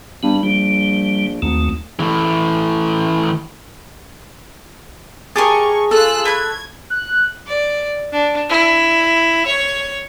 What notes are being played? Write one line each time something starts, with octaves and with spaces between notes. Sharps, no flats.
G2 B3
A#1 G3
G#1 D#2 A3
E3 A3
G4 G#4 A#4 D#5 G#5 A5 C#6
F4 A4 E6 F#6
A3 B5 F#6 G#6
F#6
D5
D4
E4
C#5